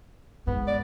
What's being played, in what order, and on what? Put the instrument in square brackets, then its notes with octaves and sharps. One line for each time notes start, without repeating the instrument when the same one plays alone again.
[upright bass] G#2 [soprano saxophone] B3
[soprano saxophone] D5